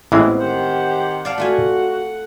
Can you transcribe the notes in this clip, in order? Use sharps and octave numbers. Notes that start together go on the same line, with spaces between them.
A1 E3 G#3 B3 C4
D#3 G4 C5 F#5
D5 F5 F#5 A5
A3 F4 F#4 G#5